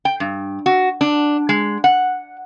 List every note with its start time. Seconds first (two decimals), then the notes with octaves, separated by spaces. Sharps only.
0.05 G5
0.20 G2
0.66 F#4
1.01 D4
1.49 G#3
1.84 F#5